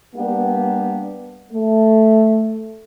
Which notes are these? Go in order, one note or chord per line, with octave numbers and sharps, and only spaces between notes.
G3 A#3 B3 D4 G4
A3